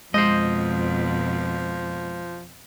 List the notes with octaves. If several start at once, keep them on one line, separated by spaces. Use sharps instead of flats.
F2 B2 F3 G#3 C5 D#5